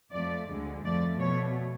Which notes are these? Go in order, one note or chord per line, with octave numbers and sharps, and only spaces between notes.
F2 F3 A3 D5
D2 D3 G#3
F2 F3 A3 D5
B2 A3 C#5